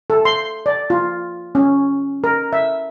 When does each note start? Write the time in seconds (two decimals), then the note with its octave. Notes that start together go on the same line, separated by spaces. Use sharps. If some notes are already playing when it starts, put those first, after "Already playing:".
0.10 A4
0.25 C6
0.66 D5
0.90 F4
1.55 C#4
2.24 A#4
2.53 E5